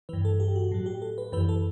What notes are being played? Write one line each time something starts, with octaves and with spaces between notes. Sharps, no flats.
G2 E3 B4
A4
G4
F#4
A2 F#3
G4
A4
B4
F#2 E3 B4
A4